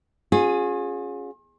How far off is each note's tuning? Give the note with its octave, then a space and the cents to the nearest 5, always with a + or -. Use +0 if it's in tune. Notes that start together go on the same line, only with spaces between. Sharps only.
C#4 +0 F4 +45 G#4 +0